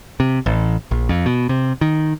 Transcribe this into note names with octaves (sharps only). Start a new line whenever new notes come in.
C3
A1
A#1
F2
B2
C3
D#3